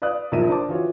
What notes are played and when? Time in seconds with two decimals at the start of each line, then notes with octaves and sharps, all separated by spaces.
0.02 B4 D5 F5 D#6 F#6
0.32 A#1 E2 F3 A#4 E5 D#7
0.48 D4 A#4 C5 A5 D6
0.69 E3 F4 F#4 C#5